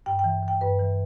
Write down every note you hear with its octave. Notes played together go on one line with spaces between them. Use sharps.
G2 G5
G5
E3
E3
G5
G2 B4
E3